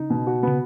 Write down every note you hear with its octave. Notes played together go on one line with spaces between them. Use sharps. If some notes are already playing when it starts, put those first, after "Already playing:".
Already playing: C#3 D#4
B2
F#4
C#3 B3